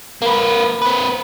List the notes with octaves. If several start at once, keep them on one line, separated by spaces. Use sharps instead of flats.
A#3 B4
C4 B4